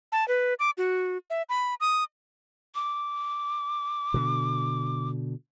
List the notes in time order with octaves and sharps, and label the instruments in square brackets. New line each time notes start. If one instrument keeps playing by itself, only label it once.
[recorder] A5
B4
D6
F#4
E5
B5
D#6
[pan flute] D6
[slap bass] B2 D3